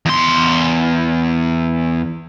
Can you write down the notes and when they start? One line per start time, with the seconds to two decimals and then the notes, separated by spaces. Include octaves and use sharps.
0.06 E2 C6